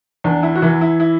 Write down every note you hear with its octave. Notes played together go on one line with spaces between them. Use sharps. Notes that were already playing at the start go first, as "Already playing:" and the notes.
E2 D4
E4
F#4
E3 E4
E4
E4